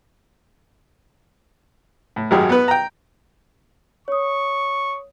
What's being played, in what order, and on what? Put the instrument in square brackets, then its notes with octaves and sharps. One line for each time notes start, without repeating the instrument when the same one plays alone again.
[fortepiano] A2
G#1 F#2 F#3 G4 G#4
B3 B4
G5 A#5
[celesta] C#5 D#6 [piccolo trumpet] C#6